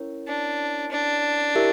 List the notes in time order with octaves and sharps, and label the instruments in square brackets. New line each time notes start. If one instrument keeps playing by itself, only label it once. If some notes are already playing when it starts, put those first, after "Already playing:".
Already playing: [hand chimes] C#4 E4 A#4 C#5
[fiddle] D4
D4
[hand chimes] E4 G4 A#4 E5